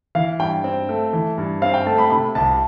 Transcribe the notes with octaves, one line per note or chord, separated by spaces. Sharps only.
E3 F5
G2 G5
C4
A3
E3
G2
C4 F5
G5
A3 A5
B5
C3 B5
C2 A5